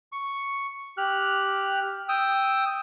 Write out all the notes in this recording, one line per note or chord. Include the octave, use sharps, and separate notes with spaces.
C#6
G4 F6 F#6
G5 D#6 E6